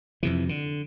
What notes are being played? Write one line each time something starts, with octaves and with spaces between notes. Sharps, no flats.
F2 C3 E3
D3